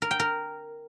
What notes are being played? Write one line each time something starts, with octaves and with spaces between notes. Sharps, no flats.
A#4
G5
A#4